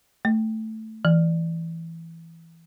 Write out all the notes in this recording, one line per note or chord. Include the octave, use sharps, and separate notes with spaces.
A3
E3